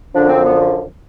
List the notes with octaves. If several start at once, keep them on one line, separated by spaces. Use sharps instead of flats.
F#2 D3 F3 D4
C4
B3